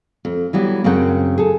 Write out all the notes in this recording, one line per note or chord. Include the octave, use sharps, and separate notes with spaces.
F2
E3 F#3 G3 B3
F#2 C#3 C4 A#4 F#5 G5
G#4 A4